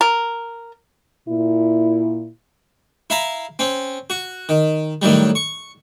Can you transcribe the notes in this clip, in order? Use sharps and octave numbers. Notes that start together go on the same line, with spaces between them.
A#4
A#2 E4
E4 E5 F5 A#5
C4 C#4
F#4
D#3
A2 D#3 F#3 G3
C#6